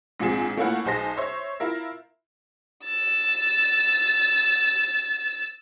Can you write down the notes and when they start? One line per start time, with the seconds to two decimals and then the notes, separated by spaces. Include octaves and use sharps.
0.20 A#1 G#2 F3 C4 G#4 E7
0.57 A3 A#3 C#4 E4 F4 F#5
0.85 B1 D#4 G#4 C5 A5 A#6
1.17 C5 C#5 E5
1.60 E4 F4 A#4 E5
2.85 E6 A6